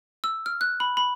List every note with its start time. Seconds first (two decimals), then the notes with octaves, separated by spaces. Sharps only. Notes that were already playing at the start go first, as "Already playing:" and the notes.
0.24 E6
0.46 F6
0.61 F#6
0.80 B5
0.97 B5